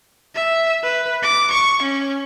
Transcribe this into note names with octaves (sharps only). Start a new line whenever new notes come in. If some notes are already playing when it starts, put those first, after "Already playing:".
E5
B4
D6
C#6
C#4